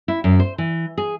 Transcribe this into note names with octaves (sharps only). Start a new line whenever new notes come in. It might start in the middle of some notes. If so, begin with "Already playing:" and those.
E4
F#2
C5
E3
G#4